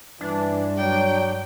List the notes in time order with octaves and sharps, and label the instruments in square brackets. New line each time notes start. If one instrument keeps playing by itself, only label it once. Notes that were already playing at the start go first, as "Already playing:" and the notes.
[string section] G2 [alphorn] E3 [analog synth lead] D4
[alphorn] F#3 [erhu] G5